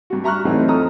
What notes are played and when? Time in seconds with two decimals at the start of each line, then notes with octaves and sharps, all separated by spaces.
0.10 G2 F#4
0.24 E5 A#5 C#6 F6 F#6
0.45 A2 E3 F#3 A3 C4 D#4
0.67 F2 F3 A4 A#5 D#6 F6